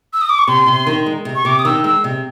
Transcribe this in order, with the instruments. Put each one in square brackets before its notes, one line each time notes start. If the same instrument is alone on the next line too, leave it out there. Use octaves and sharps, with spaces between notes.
[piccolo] E6
D#6
D6
C#6
[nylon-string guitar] C3 [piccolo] C6
[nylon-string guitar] C3
[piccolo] C6
[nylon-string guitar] D#3
G#3
C3
[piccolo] C#6
[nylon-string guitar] C3 [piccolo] D6
[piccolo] D#6
[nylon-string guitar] D#3 [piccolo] E6
[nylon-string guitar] G#3 [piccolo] E6
[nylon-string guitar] C3